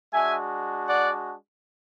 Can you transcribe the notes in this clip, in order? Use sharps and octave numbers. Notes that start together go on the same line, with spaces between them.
G#3 D4 F#4 E5 G#5
D5 F#5